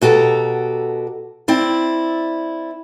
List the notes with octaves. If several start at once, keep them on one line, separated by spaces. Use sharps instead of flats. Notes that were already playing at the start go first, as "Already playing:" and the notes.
B2 F#4 G4 A4 A#5
C4 E4 D5